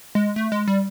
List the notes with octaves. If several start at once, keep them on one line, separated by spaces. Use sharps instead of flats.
G#3
A3
G#3
G3